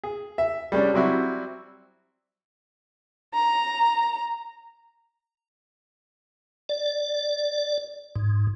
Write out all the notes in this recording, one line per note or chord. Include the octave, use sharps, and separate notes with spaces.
G#4
E5
G3 G#3 C#4 D4
F#3 G3 C4 E4 F#4
A#5
D5
G#2